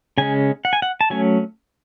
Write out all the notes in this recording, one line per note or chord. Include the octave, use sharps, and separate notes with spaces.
C#3 G#3 C#4 G#5
F#5
G#5
F#5
A5
F#3 A3 C#4 G#5